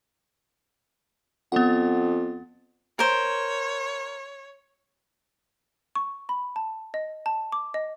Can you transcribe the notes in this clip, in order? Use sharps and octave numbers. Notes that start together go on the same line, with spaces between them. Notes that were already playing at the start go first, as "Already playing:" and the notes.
F2 B3 F#5
A#4 C5 C#5
C#6
B5
A5
D#5
A5
D6
D#5